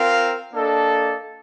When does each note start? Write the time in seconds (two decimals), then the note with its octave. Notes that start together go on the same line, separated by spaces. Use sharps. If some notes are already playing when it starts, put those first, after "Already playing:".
Already playing: C4 F4 A#4 F5
0.53 A#3 D4 A4 D#5